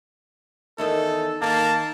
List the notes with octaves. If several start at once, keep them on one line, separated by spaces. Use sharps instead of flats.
E2 D#3 A4 D#5
D#3 A#3 A5